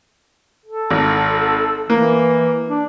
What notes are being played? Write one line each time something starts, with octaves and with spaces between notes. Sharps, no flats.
A4
G#1
E3 A#3
D4